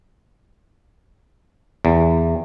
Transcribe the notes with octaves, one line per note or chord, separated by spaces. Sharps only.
E2